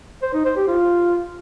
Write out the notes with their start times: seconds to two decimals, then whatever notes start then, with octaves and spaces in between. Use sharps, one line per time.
0.22 C5
0.34 D#4
0.45 C5
0.57 G4
0.68 F4